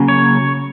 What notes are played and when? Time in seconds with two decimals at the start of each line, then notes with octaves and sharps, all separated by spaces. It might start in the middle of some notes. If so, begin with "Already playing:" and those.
Already playing: C#3 F#3 A#3 C#4
0.08 C#5